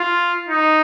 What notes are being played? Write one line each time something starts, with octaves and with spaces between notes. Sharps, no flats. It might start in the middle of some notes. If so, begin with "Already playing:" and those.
Already playing: F4
D#4